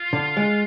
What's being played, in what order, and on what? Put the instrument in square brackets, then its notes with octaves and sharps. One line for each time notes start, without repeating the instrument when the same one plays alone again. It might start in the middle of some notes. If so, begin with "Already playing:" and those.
Already playing: [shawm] F4
[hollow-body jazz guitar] D3
G#3